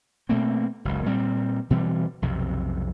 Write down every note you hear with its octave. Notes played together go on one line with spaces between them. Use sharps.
B2 A3 A#3 C4
F#1 C#2
A#2 G3 C4
B2 E3 G3 C4
B1 F2 C3